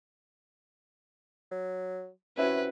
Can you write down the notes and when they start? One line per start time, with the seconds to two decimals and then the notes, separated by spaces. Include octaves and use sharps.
1.51 F#3
2.37 C3 C#4 E4 F#4 B4